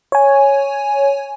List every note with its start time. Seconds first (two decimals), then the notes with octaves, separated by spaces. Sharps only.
0.12 C#5 G#5